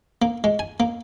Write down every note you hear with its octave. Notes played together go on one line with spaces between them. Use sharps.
A#3
G#3
G#5
A#3